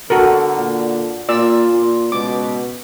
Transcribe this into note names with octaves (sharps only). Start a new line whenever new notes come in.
D3 F#4 A4 A#4
A#2
A#2 F4 D5 E6
A#2
C#2 B2 D6